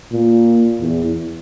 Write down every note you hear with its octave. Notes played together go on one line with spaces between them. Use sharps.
A#2
E2